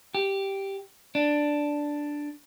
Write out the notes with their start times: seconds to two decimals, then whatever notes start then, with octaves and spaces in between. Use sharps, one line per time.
0.15 G4
1.15 D4